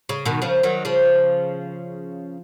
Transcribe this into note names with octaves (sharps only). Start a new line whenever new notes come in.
C#3
B2 D#3
C#3 F3
D#3 F#3
C#3 F3